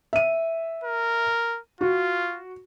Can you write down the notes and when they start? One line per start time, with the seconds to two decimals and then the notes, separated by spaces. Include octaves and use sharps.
0.13 E5 D#7
0.84 A#4
1.81 F4 F#4